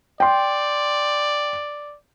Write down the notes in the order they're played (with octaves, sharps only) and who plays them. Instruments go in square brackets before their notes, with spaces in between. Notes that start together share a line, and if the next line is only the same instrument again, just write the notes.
[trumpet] D5 [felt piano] G5 C6